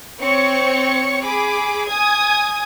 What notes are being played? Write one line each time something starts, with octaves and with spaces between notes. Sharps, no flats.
C4 C#5 C#6 C#7
G#4 B5 D6
G#5 D#6 G#6